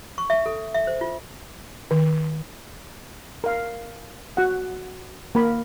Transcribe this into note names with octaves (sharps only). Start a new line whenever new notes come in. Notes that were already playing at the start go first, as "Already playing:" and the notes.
C#6
E5
A4
E5
C5
F4
D#3
A#4 F5
F#4 F#5
A#3 A#4 B5